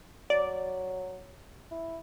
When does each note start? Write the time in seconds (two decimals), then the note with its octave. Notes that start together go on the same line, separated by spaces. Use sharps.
0.30 F#3 D5
1.71 E4